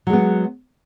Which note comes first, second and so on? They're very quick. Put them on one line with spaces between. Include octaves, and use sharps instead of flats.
F#3 G#3 B3